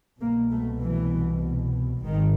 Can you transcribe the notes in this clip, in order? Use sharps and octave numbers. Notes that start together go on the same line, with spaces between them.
C2 B2 A#3
A3
E3
G#1 D#3